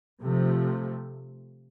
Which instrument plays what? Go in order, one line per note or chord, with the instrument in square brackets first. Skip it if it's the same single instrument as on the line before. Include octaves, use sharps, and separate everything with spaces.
[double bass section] C3 F3 A3